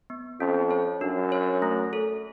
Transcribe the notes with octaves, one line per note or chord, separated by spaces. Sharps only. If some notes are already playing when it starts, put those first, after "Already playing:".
B3
F2 C#4
C#5
F#2 D4
C#5
A3
A4